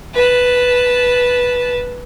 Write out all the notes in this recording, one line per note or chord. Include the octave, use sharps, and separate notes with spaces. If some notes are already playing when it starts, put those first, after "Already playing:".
B4 A5